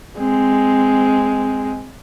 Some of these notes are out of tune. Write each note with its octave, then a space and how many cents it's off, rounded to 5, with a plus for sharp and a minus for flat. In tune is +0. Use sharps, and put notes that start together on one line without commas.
G#3 +0 C4 -5